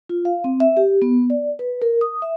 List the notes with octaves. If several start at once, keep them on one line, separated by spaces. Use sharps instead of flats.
F4
F5
C4
E5
G4
B3
D5
B4
A#4
D#6
E5